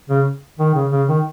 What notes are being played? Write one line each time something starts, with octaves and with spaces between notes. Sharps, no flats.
C#3
D#3
C#3
C#3
D#3